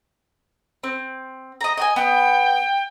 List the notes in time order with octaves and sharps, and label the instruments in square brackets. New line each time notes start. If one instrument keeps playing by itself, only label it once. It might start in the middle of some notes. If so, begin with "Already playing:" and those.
[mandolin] C4
D#5 A#5
D#5 G5 G#5
[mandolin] B3 [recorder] G5